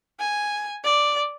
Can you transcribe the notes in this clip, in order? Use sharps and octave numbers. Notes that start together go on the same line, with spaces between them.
G#5
D5